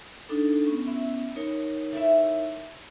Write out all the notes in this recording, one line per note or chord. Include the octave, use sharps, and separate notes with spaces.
D4 D#4 A4
B3 C#4
E4
D#4 A#4 C#5
A3 E4 E5